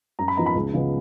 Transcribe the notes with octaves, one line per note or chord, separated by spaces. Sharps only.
F#2 A#5
B5
F3 B3 D#4 A#5
B5
C#2
C#3 F3 G#3 B3